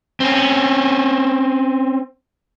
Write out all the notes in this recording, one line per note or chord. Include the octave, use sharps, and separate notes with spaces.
C4 C#4